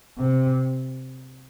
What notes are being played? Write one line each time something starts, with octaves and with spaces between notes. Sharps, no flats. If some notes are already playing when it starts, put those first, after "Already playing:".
C3